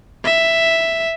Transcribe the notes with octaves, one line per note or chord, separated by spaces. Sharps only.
E5